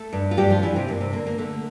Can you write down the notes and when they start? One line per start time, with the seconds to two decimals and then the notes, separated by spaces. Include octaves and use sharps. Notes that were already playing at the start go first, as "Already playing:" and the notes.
Already playing: A3 A4
0.13 G2
0.31 F4
0.37 G2 G3 G4
0.50 F3 F4
0.62 G2 E3 E4
0.76 C3 C4
0.88 G2 A#3
1.01 C3 C4
1.13 D3 A#3
1.27 A#3
1.38 D3 A3